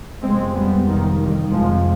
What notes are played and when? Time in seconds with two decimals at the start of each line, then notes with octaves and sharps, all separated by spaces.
0.22 F2 C3 G#3 C4
0.54 G3 B3
0.86 F2 C3 D#3
1.19 D#3 G3
1.51 F2 C3 F3 G#3